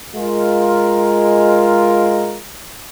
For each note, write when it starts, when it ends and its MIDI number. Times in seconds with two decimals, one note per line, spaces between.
0.15 2.38 56
0.15 2.38 65
0.15 2.38 70